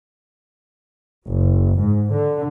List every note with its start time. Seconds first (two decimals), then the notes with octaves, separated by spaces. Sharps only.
1.30 F#1
1.80 G#2
2.14 D3